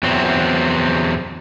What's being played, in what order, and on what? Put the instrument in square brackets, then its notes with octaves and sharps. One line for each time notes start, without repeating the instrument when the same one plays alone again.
[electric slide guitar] E2 F#3 C4